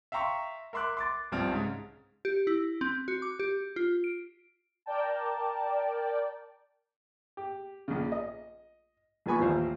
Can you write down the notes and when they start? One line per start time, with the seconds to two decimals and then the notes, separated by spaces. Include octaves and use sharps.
0.12 E5 F5 G5 A#5 C6 C#6
0.73 A#4 E5 C6 D6 F#6
0.97 C6 D6 A6
1.32 C2 G2 F3 G3 C4 F6
1.52 G#2 C#3
2.25 G4
2.47 E4
2.81 C4
3.08 F#4
3.22 D6
3.40 G4
3.76 F4
4.04 D7
4.86 A#4 D5 G5 A5
7.37 G4
7.88 A#1 C#3
8.12 D#5
9.26 A#1 A#2 B3 G#5 B5 C#6
9.39 A1 D#2 F3 C5 F5